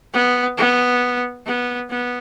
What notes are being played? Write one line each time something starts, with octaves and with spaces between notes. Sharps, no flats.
B3
B3
B3
B3